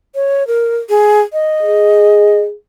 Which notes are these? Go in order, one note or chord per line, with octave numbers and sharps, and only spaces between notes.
C#5
A#4
G#4
D#5
G#4